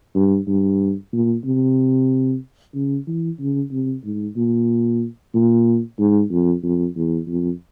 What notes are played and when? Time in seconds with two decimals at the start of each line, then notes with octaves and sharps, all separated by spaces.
0.16 G2
0.47 G2
1.13 A#2
1.45 C3
2.75 C#3
3.07 E3
3.40 C#3
3.71 C3
4.04 G#2
4.37 A#2
5.34 A#2
5.99 G#2
6.31 F2
6.64 F2
6.96 E2
7.28 F2